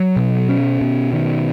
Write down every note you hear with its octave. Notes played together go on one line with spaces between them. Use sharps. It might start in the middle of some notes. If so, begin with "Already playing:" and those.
Already playing: F#3
B2
C#4
B2
D#3